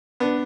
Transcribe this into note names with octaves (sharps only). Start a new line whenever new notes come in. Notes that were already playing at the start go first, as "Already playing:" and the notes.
B3 D4